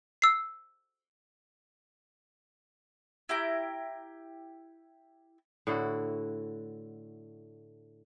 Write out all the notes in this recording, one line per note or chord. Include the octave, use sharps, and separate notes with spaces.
E6 C7
E4 G4 A#5
A2 D3 E4 F#4